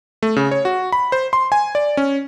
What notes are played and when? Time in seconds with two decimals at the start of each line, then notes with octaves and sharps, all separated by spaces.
0.23 A3
0.36 C#3
0.51 C#5
0.65 F#4
0.92 B5
1.12 C5
1.33 C6
1.52 G#5
1.75 D5
1.97 C#4